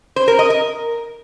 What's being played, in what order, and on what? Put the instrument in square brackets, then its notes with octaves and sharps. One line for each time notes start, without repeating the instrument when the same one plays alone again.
[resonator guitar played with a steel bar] C5
A#4
D#5
A#4